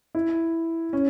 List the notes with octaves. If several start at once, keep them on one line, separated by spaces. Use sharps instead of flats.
E4
C#4